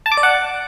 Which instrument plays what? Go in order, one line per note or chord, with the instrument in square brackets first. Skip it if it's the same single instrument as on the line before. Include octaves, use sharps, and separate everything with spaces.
[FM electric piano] A5
D6
D5
F#5